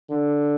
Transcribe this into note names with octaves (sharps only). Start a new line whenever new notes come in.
D3